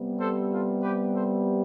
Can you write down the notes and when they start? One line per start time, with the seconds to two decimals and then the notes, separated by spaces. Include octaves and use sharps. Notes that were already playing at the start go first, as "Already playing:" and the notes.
Already playing: C3 G3 B3
0.20 A4 C5
0.52 F4 A4
0.83 G4 B4
1.14 A4 C5